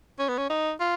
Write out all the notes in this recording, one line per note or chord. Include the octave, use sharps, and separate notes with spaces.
C#4
B3
C#4
D#4
F4